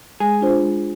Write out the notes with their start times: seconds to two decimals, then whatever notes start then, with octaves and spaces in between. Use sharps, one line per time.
0.20 G#3 G#4
0.41 D4 F4 C5
0.62 G#3